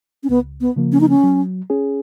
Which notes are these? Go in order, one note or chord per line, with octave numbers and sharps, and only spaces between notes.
C#4
C#2 B3
B3
C#3 F3 A#3
C#4
D#4
C#4
F#3
C#4 G#4